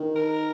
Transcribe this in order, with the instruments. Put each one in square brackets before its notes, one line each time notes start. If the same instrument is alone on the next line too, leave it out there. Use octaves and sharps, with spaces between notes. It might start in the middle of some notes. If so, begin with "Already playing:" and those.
Already playing: [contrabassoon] D#3
[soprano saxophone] A#4